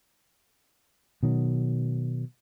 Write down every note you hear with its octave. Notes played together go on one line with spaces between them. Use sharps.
B2 D#3 F#3